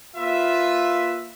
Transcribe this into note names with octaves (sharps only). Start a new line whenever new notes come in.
A#3 F4 B4 E5